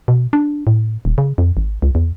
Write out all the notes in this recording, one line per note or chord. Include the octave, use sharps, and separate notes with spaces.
B2
D4
A2
D#1
C#3
F2
G#1
C#2
E2